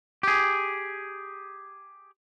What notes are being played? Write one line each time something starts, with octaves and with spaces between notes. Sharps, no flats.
G4 G#4